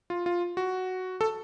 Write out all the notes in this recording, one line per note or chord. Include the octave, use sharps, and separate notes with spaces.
F4
F4
F#4
A4